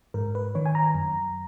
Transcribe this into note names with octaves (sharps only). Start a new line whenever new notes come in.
G#2 A#4
B4
D#3 C#5
G#5
A#5
F#2